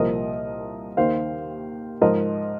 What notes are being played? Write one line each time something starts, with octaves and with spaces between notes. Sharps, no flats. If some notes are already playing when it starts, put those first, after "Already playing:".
Already playing: C2 A#2 F3 A#4 D#5
D#2 D#3 C5 F5
G#2 F3 A#4 D#5